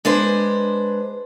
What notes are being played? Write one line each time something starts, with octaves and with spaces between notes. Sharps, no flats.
G#3 D4 B4 C5